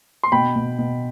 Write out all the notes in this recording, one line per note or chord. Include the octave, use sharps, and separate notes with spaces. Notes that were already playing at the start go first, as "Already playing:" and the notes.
C6
B2 G5 B5
B2
B2